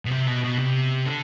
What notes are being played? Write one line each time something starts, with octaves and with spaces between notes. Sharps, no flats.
B2
C3
B2
B2
C3
D3